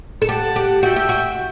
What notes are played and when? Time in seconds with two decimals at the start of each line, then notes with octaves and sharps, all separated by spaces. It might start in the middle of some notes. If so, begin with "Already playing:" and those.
0.22 A4
0.29 G4 F#5 A5
0.56 G4
0.82 F#4 E5 G5
0.96 G4
1.09 F#4